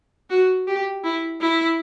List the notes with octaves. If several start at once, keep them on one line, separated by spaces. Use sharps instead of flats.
F#4
G4
E4
E4